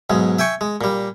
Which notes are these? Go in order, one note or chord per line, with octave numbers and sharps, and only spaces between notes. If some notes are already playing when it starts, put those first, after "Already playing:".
B1 G#2 G#3
E5 G5 G#5 C#6
G#3
A#2 G3